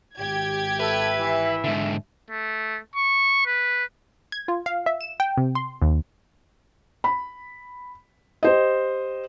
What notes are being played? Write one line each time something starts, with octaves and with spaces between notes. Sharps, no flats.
G#1 G4 G#6
A4 B4 E5
E3
G#2 D3
A3
C#6
B4
G#6
F4
F5
E5
E7
G5
C3
C6
D#2
B5
G4 C5 D#5